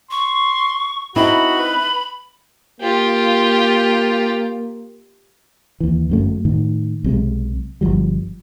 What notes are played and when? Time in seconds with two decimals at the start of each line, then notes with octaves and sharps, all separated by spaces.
0.11 C6 C#6
1.16 C4 D#4 E4 F#4 B5
1.58 B4
2.80 A#3 F4 G4
5.80 D#2 E3
6.10 G1 F#2 A3
6.45 A2 D#3
7.04 B1 C3 E3 G#3
7.81 G1 D#2 F3 G3